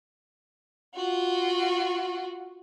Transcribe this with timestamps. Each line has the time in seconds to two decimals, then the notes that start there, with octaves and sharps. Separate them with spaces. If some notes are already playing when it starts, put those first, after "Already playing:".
0.94 F4 F#4